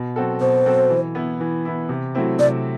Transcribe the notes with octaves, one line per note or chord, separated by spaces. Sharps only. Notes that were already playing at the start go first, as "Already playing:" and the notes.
Already playing: B2
F#3 C4 F#4 A4
B2 C5
F#3 C4 F#4 A4
E3
B3 E4
E3
B3 E4
C3
F#3 A3 C4 E4
C3 D5